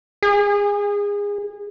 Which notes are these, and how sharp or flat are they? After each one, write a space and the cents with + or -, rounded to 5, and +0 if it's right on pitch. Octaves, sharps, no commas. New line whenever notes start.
G#4 -25